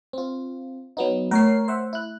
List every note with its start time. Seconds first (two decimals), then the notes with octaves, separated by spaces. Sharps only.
0.13 C4 F4
0.97 F#3 B3 D#4
1.31 A3 A#4 C#5 C7
1.68 C5 E5 F#5
1.93 E4 F#6